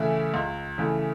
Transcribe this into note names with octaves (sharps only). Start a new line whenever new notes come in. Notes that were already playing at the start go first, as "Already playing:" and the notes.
Already playing: C#3 E3 A3 E4
C#2
C#3 E3 A3 E4